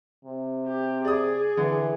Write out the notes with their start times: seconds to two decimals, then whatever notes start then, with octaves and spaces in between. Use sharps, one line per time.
0.25 C3
0.67 G4
1.05 G#4 D5 D#6
1.57 D3 E3